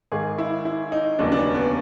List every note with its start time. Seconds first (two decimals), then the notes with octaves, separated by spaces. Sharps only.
0.12 G#1 G#2 D#3 G#4
0.38 E4
0.65 E4
0.92 D#4
1.19 F1 D#2 C#3 F#3 D4
1.32 D4
1.37 C#4
1.55 B3